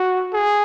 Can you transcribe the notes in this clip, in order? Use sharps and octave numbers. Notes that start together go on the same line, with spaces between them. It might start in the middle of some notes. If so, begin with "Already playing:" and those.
Already playing: F#4
G#4